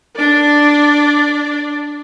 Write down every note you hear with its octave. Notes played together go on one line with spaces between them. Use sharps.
D4 D5